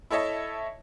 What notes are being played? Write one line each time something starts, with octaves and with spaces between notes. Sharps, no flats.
E4 A4 C#5 D#5 E5 A5